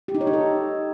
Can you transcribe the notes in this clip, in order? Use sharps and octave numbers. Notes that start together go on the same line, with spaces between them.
G4
D#4
C#5
D#4
A4